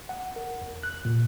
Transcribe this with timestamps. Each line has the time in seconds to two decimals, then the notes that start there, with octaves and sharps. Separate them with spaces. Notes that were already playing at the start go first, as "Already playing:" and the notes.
0.09 F#5
0.36 A#4
0.61 E2
0.83 F#6
1.05 A#2